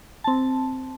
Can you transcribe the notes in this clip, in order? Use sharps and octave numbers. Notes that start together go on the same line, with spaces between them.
C4 A5